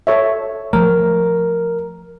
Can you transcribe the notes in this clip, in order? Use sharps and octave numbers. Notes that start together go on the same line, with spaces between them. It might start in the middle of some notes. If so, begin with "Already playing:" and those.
A4 C#5 E5
F3 A3 A#4